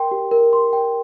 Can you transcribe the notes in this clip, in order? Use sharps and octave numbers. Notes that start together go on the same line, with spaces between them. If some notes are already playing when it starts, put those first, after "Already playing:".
Already playing: A#4 G5 C6
G4
A#4
C6
G5